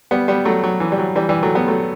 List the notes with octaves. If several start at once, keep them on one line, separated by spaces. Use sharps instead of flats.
G3 B3
G3 B3
F#3 A3
F#3
E3
G3
F#3
E3 G3
E3 G3
F#3 A3
G3 B3
F#3 A3